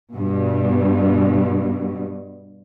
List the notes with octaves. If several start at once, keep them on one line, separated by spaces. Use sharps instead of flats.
G2 B2